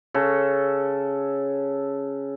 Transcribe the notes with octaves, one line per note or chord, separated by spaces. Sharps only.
C#3 A4